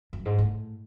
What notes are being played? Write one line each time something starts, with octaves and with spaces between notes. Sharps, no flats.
F#2
G#2
A2